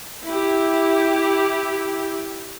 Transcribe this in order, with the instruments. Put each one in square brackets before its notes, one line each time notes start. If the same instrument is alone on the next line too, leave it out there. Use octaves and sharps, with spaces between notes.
[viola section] E4 G4